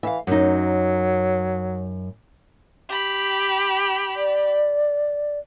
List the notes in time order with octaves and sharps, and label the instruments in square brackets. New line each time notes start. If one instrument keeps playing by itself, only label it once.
[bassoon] E3 [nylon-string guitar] E5 F5
[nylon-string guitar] F#2 D#4 [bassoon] F#3
[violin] G4 B5
[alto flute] D5